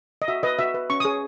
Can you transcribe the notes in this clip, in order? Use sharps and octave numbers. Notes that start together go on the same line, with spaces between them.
D#5
F#4 E5
B4 D#5
F#4 E5
B4
C#4 C#6
D#6
G#4 C#5